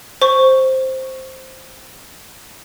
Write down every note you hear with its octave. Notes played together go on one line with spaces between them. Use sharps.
C5 C#6